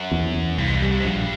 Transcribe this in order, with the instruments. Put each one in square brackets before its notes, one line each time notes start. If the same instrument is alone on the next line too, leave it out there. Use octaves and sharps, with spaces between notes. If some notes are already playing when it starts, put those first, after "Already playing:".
Already playing: [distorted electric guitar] F#2
[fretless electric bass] E2
E2
[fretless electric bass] C2 [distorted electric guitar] G2
[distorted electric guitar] G#2
G2
[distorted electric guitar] G#2 [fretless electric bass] G3
[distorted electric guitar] G2
G#2
[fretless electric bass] A#1 [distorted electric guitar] G2